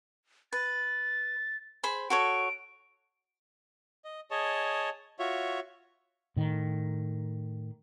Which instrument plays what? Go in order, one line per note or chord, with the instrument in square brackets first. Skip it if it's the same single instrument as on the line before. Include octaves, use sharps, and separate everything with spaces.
[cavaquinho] B4 [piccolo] A6
[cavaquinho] G#4 C5 B5
[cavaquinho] F#4 A4 C#5 [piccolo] D7
[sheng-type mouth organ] D#5
G#4 C#5 D#5 A5
F4 F#4 C#5 E5
[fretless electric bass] A2 D#3